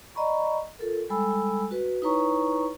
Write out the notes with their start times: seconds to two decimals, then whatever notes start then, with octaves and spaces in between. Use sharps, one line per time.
0.15 D5 D#5 A#5 B5 C#6
0.79 F4 A4 A#4
1.09 G3 G#3 A4 G#5 B5 E6
1.71 F#4 B4
2.02 D#4 E4 B4 C#5 A#5 C#6